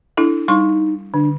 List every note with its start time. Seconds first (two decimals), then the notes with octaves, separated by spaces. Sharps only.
0.17 D4 E4 A4
0.48 G3 D#4 C6 C#6
1.14 D3 D4